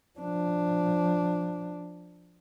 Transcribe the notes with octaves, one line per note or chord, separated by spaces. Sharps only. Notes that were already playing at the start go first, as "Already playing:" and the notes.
F3 D4